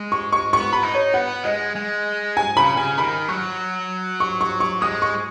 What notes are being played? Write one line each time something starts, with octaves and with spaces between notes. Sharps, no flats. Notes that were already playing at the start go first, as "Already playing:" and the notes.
Already playing: G#3
C#6
C#6
B3 C#6
B5
D#4
C#5
B3 F#5
G#3 D#5
G#3
G#5
C#3 B5
C#3 G#5
D#3 B5
F#3 C#6
C#6
C#6
C#6
G#3 D#6
C#6